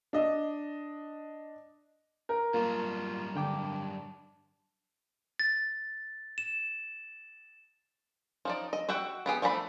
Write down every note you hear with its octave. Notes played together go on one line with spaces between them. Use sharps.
D4 D#5
A#4
G2 F#3 A#3 F4
D3 D4 G5 D6
A6
E7
F3 D#4 D5
D#5
F#4 E5 F#5 G5
B3 G4 G#4
F3 A3 D4 A#5 B5